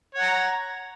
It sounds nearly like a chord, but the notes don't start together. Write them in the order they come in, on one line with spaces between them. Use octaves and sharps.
C#5 F#5 A#5